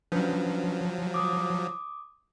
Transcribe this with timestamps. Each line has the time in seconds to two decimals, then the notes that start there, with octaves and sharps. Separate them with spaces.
0.12 F3 F#3 C#4 D4 B4
1.14 D6 D#6